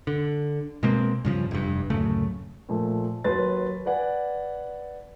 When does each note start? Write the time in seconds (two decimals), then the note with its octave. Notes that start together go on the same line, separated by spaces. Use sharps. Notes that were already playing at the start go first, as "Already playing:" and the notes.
0.07 D3
0.83 B2 G#3 A#3 C4
1.25 G2 C#3 F3
1.51 F1 G2
1.90 D1 F#2 C#3 A3
2.69 A#2 F3 A3
3.24 D#2 F#3 B4 C6 A6
3.86 B4 D5 F#5 G#5